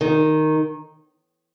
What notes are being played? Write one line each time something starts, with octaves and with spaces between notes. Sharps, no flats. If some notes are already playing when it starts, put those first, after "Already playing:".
D#3